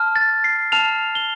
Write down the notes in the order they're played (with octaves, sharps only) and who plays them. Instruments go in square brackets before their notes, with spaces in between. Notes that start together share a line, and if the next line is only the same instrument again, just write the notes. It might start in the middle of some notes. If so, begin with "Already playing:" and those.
Already playing: [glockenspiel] A5 F6
A6
C7
A5 F6 F7
G7